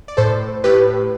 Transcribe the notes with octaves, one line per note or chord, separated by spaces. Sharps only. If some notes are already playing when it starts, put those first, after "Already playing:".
D5
A2 A4 C5
A2 G4 B4